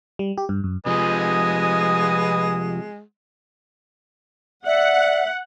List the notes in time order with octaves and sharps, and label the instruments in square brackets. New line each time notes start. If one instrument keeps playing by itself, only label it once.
[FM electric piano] G3
G4
G2
F#2
[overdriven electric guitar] C3 F3 [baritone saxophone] G#3 [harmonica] B4 D#5 G#5 [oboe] D#6
[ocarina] D5 [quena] E5 [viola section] F#5